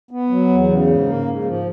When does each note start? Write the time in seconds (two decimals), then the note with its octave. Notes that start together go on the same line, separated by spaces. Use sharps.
0.11 B3
0.29 F#3
0.49 E2
0.68 C#3
0.87 G#2
1.06 A#3
1.25 G#2
1.44 F3